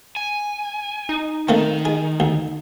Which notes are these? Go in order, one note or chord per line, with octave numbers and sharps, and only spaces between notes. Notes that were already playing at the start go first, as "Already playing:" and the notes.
G#5
D#4
D#3 A3 A#3 C4
G#4
D2